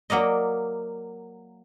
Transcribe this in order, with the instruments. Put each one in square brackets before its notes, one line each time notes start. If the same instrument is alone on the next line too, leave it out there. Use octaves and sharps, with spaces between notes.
[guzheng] F#3 A#3 D5 D#5